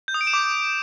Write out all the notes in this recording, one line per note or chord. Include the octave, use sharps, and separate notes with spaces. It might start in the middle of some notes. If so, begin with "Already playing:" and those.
G6
D#6
D7
E7
D6